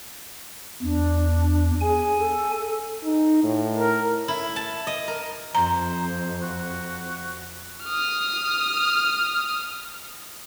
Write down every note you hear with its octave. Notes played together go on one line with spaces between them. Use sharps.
E2 D4
G#4 G#5
A4
D#4
A2
A#4
E4
A5
D#5
A#4
F2 C5 A#5
F#4
D#6 F6